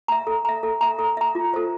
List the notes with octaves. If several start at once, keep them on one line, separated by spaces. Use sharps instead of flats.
E5 A#5
A4
E5 A#5
A4
E5 A#5
A4
E5 A#5
F4
A4 C5